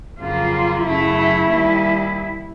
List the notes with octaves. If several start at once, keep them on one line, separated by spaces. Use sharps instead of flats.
F2 C#3 F#3 A#3 F4
F#2 C#3 F#3 A3 E4
D#2 D#3 G3